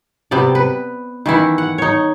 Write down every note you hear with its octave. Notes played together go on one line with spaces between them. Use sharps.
C3 B3 D5
B4
D#3 E3 E4 F#5
F#5
D#4 C#5